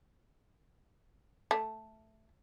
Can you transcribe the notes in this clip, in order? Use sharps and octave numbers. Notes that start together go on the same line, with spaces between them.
A3